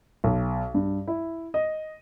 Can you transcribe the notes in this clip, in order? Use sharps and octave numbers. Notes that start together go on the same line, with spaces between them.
B1
G2
E4
D#5